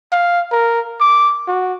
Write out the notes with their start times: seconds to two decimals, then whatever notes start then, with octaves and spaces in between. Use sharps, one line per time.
0.12 F5
0.52 A#4
1.00 D6
1.48 F#4